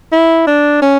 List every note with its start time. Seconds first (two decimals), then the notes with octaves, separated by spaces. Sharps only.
0.12 E4
0.47 D4
0.82 C#4